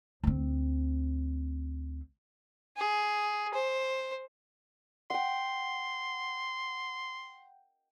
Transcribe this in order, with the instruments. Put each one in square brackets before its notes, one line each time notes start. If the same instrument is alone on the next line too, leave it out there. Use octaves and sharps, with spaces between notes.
[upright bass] D2 C4
[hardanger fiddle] G#4
C5
[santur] F#5 G5 [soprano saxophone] C6